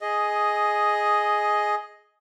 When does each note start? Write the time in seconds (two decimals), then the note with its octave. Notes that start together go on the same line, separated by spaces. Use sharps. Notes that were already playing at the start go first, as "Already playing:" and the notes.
0.01 G#4 D#5